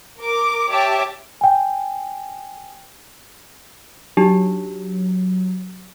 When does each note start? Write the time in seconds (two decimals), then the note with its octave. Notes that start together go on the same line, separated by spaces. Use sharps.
0.18 A#4 D6
0.69 G4 C#5 E5 G5 A5 D6
1.41 G5 G#5
4.17 F#3 D4 D#4 G4